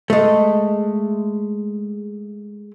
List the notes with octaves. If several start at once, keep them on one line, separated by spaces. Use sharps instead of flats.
G#3 A3